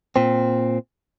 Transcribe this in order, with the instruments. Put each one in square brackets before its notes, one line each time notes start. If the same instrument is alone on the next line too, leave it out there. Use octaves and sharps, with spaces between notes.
[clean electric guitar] A#2 C4